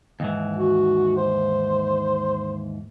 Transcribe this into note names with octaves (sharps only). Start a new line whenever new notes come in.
D#2 G#2 E3
F#4
C5